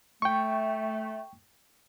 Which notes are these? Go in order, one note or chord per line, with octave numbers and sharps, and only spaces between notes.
A3 G5 C#6